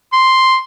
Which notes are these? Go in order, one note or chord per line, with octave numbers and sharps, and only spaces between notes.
C6